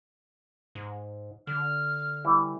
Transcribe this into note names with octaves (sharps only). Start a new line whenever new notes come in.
G#2
D3 F6
E3 G3 E4